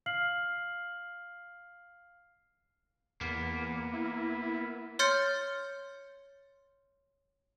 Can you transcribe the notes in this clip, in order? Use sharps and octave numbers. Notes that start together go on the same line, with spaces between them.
F5 F6 C7 F#7
E2 A#3 B3
E4
C#5 C6 F6 G6 A6 C#7